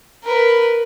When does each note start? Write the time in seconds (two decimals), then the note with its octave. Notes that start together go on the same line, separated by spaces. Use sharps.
0.24 A#4 B4